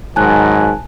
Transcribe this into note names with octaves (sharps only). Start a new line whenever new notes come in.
G#2 D#3 F#3 G#5 A5 F#6